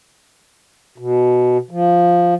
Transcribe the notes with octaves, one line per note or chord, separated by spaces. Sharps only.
B2
F3